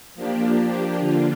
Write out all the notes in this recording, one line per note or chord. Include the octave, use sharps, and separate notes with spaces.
F3 A#3 D4 G4
D3 A#3 D4 F4